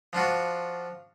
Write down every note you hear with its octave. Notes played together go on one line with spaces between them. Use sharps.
F3 D4 F4 F#4